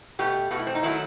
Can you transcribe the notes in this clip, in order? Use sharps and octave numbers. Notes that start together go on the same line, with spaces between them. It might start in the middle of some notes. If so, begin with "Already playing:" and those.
B2 A3 G4
B2 A3 F#4
E4
C4
D#4
D#3 F#3 A3 E4